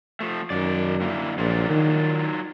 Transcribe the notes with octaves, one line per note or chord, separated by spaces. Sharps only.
F3 A3
F#2 D#3 D5
D3 A#3 E4
A#1 F#3 F4 D5
D#3